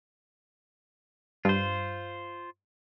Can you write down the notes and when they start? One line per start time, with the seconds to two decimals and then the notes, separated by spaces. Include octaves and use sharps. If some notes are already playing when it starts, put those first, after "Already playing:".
1.45 G2 F4 C5